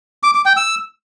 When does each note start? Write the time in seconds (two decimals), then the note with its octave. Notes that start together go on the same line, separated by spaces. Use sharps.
0.23 D6
0.34 D6
0.46 G5
0.57 E6